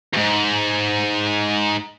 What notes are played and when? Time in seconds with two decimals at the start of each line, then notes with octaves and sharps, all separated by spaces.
0.14 E2 G#2